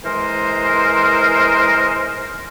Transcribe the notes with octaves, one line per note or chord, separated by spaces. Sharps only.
E3 G#3 A#4 C5